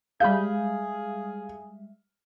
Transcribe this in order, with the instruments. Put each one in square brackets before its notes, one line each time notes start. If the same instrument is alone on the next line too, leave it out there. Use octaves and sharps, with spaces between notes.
[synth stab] G3 G#3 E5 [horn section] G#4 [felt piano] F5 [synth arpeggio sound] B5 G6